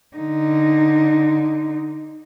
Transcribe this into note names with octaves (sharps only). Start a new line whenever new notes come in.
D3 D#4